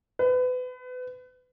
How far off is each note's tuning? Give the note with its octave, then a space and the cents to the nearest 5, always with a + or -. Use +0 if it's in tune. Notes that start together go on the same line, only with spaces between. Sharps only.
B4 +30